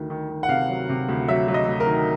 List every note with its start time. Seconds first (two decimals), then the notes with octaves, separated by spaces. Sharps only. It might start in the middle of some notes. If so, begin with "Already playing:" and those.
Already playing: D2 D#3
0.10 D#3
0.29 D#3
0.43 F#5
0.49 C3 F5
0.68 F#3
0.89 C3
1.09 D2
1.28 F#3 E5
1.48 F#3
1.54 D#5
1.68 D2
1.80 A#4
1.87 D#3